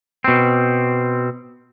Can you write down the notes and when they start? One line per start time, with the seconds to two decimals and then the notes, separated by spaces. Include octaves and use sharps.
0.24 B2 C4